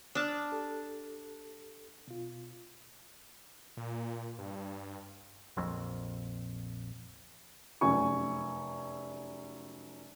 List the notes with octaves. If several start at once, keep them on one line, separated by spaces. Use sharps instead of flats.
D4 A5 D#6 F6
G4 A4
B2 F4
A#2
G2
A#1 F2
F1 F#2 G#5 C#6